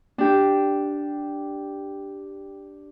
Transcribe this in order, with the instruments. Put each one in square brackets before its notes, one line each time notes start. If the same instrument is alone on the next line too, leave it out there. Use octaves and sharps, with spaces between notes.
[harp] D4 G4